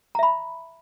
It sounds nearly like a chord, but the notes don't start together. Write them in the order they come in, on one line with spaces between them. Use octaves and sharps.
A#5 E5 B5